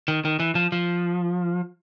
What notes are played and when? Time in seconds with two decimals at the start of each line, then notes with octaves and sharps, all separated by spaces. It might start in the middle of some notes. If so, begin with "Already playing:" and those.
0.08 D#3
0.25 D#3
0.40 E3
0.55 F3
0.72 F3